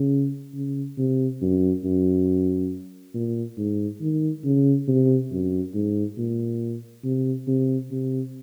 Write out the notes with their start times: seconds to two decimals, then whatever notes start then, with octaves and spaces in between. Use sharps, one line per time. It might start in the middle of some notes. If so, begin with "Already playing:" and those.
Already playing: C#3
0.54 C#3
0.98 C3
1.42 F#2
1.84 F#2
3.14 A#2
3.57 G#2
4.01 D#3
4.44 C#3
4.88 C3
5.31 F#2
5.74 G#2
6.18 A#2
7.04 C3
7.47 C3
7.91 C3